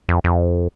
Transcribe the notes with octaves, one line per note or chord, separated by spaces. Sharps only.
F2
F2